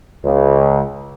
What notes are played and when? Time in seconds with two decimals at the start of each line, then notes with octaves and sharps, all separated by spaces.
0.24 C#2 C#3